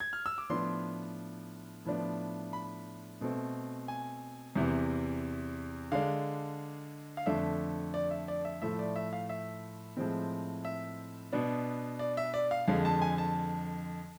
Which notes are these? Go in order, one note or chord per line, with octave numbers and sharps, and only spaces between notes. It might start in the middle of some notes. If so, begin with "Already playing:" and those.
G#6
F6
E6
D6
A2 F3 B3 D4 C6
A2 F3 B3 D4
B5
B2 A3 C4
G#5
E2 C3 E3
D3 G#3 D4 F5
F5
F2 D3 A3 D4 E5
D5
E5
D5
E5
A2 F3 A3 E5
D5
E5
F5
E5
A2 F3 G#3 C4
E5
B2 B3 D4
D5
E5
D5
F5
F2 D3 G#3 F5
A5
G#5
A5